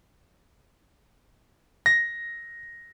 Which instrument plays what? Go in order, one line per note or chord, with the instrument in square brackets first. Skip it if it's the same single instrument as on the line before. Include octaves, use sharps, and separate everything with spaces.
[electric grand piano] A#6